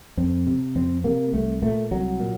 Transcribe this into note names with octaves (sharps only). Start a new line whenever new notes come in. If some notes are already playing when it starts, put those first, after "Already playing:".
F2 C4
C3
F2 C4
C3 A#3
C2 A3
A#2 A3
C2 F#3
A#2